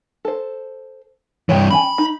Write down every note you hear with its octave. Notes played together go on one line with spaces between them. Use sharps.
A4 C5
G2 E3 C#5 G5
C#4 G5 G#5 B5
D#4